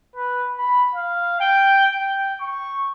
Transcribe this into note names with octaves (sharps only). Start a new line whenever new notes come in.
B4
B5
F5
G5
G5
C#6